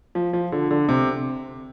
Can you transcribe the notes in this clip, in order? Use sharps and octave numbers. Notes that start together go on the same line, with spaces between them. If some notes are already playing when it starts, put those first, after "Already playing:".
F3
F3
D3
D3
C3